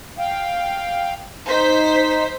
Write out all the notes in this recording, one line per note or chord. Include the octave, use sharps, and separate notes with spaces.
F5 G5
D#4 C5 B6